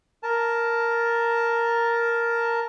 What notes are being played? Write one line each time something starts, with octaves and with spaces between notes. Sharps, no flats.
A#4 A5